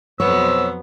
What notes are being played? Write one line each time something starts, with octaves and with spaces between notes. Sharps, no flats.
F2 B2 F#3 B3 C5 C#5 E6